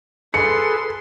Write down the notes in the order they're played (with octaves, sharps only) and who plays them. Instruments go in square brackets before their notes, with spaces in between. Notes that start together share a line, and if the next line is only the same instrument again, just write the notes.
[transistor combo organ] G#4 A4 B4 [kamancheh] C6 [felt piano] C#7